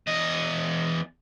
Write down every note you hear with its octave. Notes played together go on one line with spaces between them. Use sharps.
E2 D#5